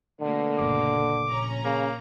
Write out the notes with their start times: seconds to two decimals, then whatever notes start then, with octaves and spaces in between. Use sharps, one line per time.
0.21 B2 D3 A3 A#3
0.59 F#1 A#2 D6
1.27 A#1 C#4 A#5
1.65 C#3 A#3